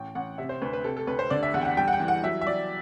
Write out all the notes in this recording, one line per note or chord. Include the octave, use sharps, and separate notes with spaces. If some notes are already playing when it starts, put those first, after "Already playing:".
Already playing: A1 G5
A1 F#5
C3 E5
C5
D2 B4
B4
C3 A4
A4
D2 B4
C5
D3 D5
E5
E2 F#5
G5
F#5
G3 G5
F#5
G5
E3
F#5
F#3 E5
E5
F#3 D5